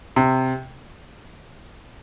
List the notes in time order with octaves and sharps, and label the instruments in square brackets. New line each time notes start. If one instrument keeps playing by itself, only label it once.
[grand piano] C3